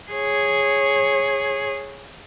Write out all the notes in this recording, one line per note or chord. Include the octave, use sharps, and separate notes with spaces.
G#4 C#5